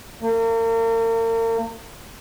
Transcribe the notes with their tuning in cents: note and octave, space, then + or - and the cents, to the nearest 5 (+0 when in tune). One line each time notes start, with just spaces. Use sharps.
A#3 -40